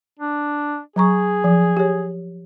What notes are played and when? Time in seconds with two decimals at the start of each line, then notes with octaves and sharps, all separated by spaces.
0.19 D4
0.96 F#3 G#4 A#5 C#6
1.44 F3
1.77 G4 C#5